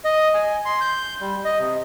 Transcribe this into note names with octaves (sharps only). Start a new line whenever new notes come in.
D#5
G#5
C6
G6
G3
D#5
C3